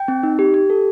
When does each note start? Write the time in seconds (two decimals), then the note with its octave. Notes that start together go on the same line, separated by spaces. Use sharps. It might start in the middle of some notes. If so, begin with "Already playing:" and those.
Already playing: G5
0.08 C4
0.23 D#4
0.39 G4
0.54 G4
0.70 A4